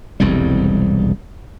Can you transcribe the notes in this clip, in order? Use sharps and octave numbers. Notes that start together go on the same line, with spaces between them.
E1 C2 F2 G3